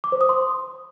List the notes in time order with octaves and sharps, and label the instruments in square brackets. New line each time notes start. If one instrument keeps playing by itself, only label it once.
[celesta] D6
C5
D#6
C6